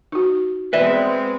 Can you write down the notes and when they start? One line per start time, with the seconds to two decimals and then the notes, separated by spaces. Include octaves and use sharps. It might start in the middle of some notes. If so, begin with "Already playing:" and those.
0.12 D#4 F#4
0.73 G#3 B3 C4 B4 D5 E5